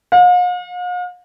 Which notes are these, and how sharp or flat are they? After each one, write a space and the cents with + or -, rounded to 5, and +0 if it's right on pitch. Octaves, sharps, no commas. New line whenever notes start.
F5 +45